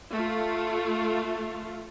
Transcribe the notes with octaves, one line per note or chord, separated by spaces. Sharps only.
A3 F4